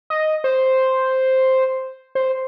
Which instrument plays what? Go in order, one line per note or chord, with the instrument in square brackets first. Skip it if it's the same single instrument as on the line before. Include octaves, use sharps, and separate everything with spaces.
[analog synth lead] D#5
C5
C5